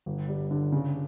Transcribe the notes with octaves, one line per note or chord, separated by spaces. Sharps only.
G1
G3
D3
C#3